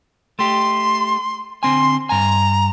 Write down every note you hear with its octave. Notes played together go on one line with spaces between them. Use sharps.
A3 G4 C6
D3 C4 G#5 C6
G2 G#5 A#5